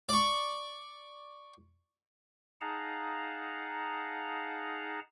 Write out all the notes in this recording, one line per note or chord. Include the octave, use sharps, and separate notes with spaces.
D5 C#6
D#4 G#4 F5 F#5 A5 A#5